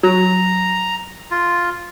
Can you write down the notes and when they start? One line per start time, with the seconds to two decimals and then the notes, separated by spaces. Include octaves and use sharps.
0.03 F#3 A#5
1.31 F4